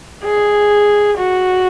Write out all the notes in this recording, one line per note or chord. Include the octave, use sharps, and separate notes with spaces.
G#4
F#4